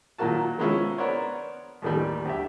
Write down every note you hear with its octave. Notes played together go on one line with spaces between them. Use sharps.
A#2 D#3 F#3 A#3 F#4 A5
D#3 F3 G#3 B3 C#4 E4
B3 D4 A#4 C5 C#5
D#2 A2 D#3 E3 G3
D2 G4 E5